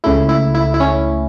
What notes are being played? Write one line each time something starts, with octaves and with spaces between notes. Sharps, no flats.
C#2 C#3 A3 E4
E4
E4
E4
C#4